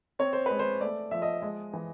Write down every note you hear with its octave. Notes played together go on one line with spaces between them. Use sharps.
C4 C#5
C5
G#3 B4
C5
A3 D5
F3 E5
D#5
G#3
E3